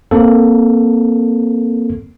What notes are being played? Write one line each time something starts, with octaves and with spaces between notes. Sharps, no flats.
A#3 C4 A4